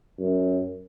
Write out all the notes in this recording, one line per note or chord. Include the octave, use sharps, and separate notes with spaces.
F#2